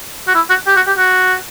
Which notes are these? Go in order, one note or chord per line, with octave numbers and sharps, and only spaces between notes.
F#4
E4
F#4
G4
F#4
G4
F#4